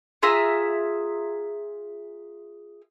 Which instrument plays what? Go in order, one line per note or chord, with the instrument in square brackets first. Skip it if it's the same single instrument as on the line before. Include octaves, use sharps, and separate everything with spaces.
[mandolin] F4 G#4 E5 A#5